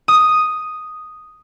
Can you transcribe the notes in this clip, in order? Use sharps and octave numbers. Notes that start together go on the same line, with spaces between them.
D#6